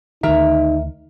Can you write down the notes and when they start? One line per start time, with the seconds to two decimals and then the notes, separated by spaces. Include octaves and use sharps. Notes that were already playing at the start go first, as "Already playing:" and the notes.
0.23 D2 D#3 D#4 A#4 E5 A#5